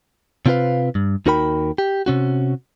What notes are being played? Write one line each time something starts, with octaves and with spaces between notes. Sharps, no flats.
C3 C4 F4 G4 B4 F5
G2
D#2 D#4 F#4 A#4 G5 B5
G4
C3 C#4 F#4